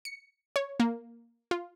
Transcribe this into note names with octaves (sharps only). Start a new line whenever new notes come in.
C#7
C#5
A#3
F4